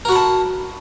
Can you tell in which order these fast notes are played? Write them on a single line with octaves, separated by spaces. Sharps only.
A#4 F#4 B5 A5